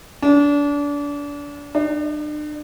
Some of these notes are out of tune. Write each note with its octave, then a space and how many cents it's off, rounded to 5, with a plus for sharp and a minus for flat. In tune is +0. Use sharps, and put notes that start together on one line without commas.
D4 -30
D4 +40